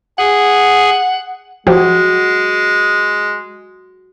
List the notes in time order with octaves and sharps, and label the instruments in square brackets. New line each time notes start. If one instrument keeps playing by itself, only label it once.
[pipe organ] G#4 [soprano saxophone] F#5
[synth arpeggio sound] F3 G4 [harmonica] G#3 [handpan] F#4